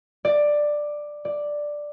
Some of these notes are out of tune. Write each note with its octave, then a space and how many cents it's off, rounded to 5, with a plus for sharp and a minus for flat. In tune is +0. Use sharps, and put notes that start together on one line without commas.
D5 +10
D5 +5